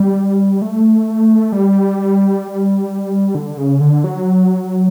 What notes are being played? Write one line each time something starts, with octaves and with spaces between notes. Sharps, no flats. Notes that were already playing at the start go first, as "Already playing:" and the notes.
Already playing: G3
A3
G3
D3
C#3
D3
F#3